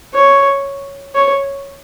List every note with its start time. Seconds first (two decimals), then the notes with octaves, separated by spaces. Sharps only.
0.14 C#5
1.15 C#5